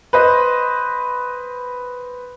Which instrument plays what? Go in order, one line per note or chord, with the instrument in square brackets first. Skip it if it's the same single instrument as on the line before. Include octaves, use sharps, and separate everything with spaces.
[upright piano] B4 C5 D#5